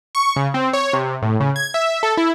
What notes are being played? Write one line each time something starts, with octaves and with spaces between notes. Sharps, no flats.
C#6
C#3
C4
C#5
C3
A2
C#3
G#6
E5
A4
E4